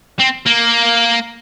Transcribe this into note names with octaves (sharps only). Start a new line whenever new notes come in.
C4
A#3